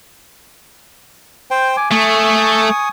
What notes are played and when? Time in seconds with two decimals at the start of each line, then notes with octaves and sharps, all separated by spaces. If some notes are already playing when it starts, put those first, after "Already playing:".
1.51 C5 G5
1.77 G#5 D6
1.91 A3 G#5 C#6 D#6